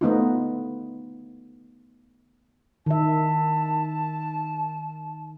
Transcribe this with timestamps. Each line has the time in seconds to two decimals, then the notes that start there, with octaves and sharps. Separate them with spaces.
0.01 A3 B3 D#4 F4
2.86 D#3 E5 A5